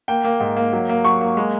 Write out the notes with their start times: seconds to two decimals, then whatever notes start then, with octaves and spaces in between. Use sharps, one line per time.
0.08 A#3 G5
0.24 A#3
0.40 G#2
0.57 A#3
0.73 F#3
0.89 A#3
1.04 F#3 C#6
1.21 A#3
1.37 G#3